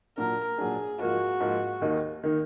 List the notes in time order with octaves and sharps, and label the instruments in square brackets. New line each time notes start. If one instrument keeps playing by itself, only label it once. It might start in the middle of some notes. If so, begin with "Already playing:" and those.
[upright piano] A#2 F#3 D4 [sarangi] A#4
[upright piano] A#2 F#3 D4 [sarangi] G#4
[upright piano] G#2 F3 A#3 F4 [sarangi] F#4
[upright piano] G#2 F3 A#3 F4
D#2 D#3 A#3 D#4
D#3 A#3 D#4